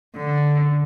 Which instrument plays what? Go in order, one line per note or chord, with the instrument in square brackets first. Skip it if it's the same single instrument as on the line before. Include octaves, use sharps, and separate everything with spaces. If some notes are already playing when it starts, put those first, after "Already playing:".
[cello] D3